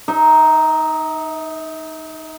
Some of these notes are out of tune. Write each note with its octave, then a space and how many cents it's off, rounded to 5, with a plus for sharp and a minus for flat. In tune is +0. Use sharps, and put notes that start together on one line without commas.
D#4 +0 E5 -45